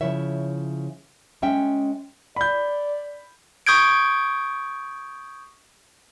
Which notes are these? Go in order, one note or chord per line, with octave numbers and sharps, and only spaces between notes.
C#3 F3 E4 C#5 E5
G#3 C#4 E5 G5
D5 B5 G6
C#6 D#6 G6 G#6 D7